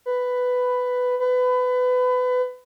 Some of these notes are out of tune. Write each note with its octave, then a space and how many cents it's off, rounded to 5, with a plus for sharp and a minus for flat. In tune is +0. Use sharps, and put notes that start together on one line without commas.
B4 +10
B4 +25